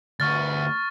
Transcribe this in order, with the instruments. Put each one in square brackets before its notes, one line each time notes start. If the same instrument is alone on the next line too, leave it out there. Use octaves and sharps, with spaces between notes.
[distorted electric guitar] D2 B3 [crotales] C#6 F6 A6